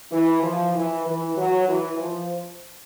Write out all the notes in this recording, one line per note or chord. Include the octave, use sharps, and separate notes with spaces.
E3
F3
E3
E3
F#3
E3
F3